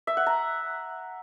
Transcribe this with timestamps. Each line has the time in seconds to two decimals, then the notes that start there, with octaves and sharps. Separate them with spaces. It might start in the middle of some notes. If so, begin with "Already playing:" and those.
0.07 E5
0.17 F#5
0.26 A#5